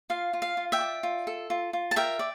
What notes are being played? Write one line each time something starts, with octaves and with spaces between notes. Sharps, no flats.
F4 F5
F4
F5
F4
E5 G5
D5
F4
A4
F4
F4
A5
A#4 E5 G5
D5